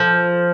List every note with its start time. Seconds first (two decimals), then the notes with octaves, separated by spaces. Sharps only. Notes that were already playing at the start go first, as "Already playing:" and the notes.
Already playing: F3 A4